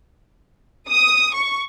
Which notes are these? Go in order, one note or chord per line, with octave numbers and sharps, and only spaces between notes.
D#6
C#6